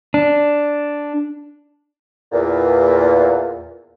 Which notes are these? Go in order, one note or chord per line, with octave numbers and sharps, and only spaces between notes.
D4
E2 A#2